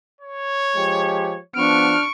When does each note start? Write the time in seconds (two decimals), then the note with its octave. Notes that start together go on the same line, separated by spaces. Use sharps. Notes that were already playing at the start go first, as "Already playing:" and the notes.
0.21 C#5
0.76 F3 G#3 G4
1.56 F3 B3 D4 C#6 F6 D7